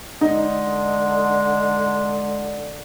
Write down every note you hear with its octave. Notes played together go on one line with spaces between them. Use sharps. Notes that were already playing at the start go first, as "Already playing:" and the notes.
D3 G#3 D#4